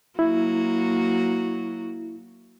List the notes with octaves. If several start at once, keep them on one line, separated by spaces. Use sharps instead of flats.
F#3 A#3 E4 F#4